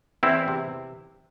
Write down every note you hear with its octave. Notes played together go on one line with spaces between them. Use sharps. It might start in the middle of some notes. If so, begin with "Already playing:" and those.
E2 C4 E4
C3